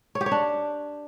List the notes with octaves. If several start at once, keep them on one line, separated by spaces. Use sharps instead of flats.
C#5
G4
C#5
D4